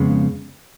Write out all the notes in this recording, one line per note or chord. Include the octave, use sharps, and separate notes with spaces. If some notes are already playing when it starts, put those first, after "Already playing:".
Already playing: F2 C#3 G#3 B3